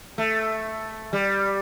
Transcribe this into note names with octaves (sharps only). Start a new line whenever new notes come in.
A3
G3